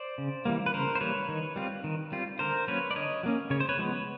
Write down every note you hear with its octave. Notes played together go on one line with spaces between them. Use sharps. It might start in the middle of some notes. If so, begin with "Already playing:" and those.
Already playing: C5 D5
C#3
E3 G3 A#3
B4
C#3 A#4 C5
C5
E3 G3 A#3 B4 C#5
D#3
G3 C4 F4
D#3
G3 C4 F4
D3 A#4 C5
F#3 A#3 C#4 B4 C#5
D5
D3 C#5 D#5
F#3 A#3 C#4
C#3 C#5
C5
B4 C#5
F3 G#3 B3